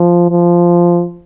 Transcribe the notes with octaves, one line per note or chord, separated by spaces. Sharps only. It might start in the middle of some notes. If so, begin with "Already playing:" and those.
Already playing: F3
F3